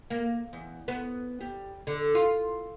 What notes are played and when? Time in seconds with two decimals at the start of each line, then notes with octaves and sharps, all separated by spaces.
0.10 A#3
0.53 E2
0.88 B3
1.41 G3
1.87 D3
2.15 F4